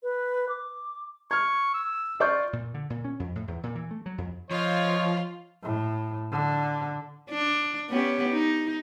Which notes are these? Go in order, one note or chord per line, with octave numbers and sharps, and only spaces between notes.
B4
D6
C#6 F6 G#6
E6
F4 D5 C#6 G6
A#2
D3
A#2
C#4
F2
A2
E2
A#2
E3
A3
F#3
F2
F3 F4 C#5 D#5 F5
A2
D3
D4
B3 C#4 G4
D#4